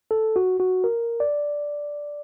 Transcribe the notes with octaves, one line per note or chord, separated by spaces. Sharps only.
A4
F#4
F#4
A#4
D5